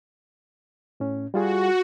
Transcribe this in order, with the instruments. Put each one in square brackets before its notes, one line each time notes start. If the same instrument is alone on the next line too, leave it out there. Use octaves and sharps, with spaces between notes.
[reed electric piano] A2 C#4
[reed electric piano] G3 F4 G#4 [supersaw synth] F#4